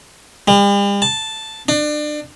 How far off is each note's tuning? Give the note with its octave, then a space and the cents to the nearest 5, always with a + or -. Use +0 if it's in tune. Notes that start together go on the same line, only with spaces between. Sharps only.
G3 +45
A5 +0
D4 +30